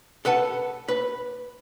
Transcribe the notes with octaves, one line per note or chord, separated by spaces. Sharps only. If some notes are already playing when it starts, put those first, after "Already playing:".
A4 B4 F#5 A5
B4